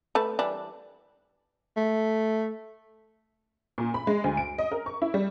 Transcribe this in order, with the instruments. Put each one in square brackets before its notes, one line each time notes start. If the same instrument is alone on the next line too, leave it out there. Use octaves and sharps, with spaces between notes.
[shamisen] A3 B4 A5
E3 G3 D4
[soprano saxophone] A3
[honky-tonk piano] A#2
B5
G#3
D2
D7
D#5
A#4
C#6
E4
G3